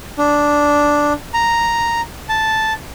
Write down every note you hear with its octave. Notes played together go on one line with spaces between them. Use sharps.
D4
A#5
A5